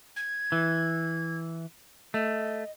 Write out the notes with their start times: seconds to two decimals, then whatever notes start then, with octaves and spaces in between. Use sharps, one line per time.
0.16 G#6
0.52 E3
2.14 A3 D#5